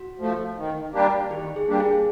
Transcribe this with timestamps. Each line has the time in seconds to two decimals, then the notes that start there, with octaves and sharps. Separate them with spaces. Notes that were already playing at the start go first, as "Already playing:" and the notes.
Already playing: F#4
0.20 F3 A3
0.57 D#3
0.94 G3 A#3 D4 G4
1.31 D#3 G4
1.56 G#4
1.68 G3 A#3 D4 G4
1.80 G#4